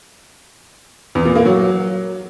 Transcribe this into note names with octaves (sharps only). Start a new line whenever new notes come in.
E2
A#2
A#3
F#3